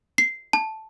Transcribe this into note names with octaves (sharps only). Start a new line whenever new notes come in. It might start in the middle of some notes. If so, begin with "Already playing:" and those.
C7
A5